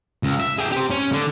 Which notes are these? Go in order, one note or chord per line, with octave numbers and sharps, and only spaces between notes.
C#2
E5
G#4 G5
G4 C5
C#4
D3